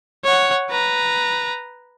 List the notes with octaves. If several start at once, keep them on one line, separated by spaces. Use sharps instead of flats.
C#5 F#5
B4 A#5